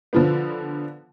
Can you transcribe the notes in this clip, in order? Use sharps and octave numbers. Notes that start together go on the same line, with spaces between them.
D3 F3 B3